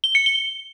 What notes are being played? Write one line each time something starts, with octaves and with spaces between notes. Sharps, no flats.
G7
C#7
G7